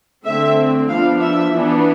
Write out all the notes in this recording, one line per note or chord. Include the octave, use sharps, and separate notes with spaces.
D3 A3 C4 E5
F3 B3 D4 F5
E5
E3 B3 D4